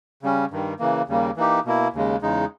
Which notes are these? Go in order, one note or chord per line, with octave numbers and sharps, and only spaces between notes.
C#3 G3 C#4
G2 D#3 G3
C#3 E3 A#3
D#2 C#3 G3 A#3
E3 A#3 D#4 G4
B2 A#3 E4
D#2 C#3 G#3
E2 C#3 G#3 D#4